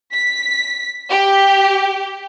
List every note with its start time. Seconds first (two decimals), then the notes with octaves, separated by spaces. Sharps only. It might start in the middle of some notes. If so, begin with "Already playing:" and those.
0.11 B6
1.08 G4